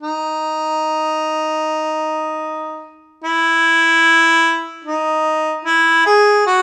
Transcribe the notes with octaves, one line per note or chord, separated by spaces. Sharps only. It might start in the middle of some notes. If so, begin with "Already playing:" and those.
D#4
E4
D#4
E4
G#4
F#4